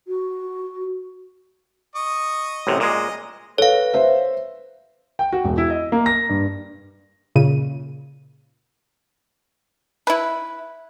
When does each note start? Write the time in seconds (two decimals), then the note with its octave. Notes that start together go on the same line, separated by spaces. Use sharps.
0.07 F#4
1.95 D#5 C#6 D#6
2.67 A1 F#2 C3
2.80 A#2 G#3 D#5
3.58 A4 B4 C#5 F5
3.94 C5 E5
5.19 G5
5.32 F#4
5.44 E1
5.58 E4
5.70 D#5
5.92 A#3
6.06 A#6
6.29 G2
7.36 A#2 C#3 D#7
10.07 E4 B4